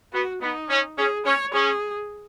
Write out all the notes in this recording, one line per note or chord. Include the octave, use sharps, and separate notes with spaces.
B3 F#4
B3 D#4
C#4
C#4 G#4
C#4 C#5
C#4 G#4